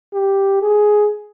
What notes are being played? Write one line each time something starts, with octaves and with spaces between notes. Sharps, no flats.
G4
G#4